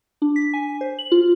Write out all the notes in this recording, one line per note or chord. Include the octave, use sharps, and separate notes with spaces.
D4
B6
G#5
C5
F#7
F4